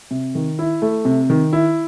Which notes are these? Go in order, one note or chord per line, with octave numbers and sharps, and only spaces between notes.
C3
D#3
E4
A3
C3
D#3
E4